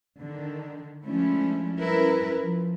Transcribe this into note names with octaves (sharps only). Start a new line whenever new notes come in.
D3 D#3
F3 G#3 A3 C#4 D4 E4
G3 C#4 E4 A#4 B4
F3